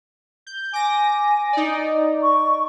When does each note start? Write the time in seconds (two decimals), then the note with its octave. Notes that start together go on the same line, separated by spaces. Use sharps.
0.47 G6
0.73 G#5 D6 A#6
1.53 D#4 D5
2.23 C#6